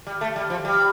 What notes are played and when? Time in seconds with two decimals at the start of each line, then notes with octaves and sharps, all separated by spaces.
0.07 G3
0.21 A3
0.36 G3
0.50 F3
0.65 G3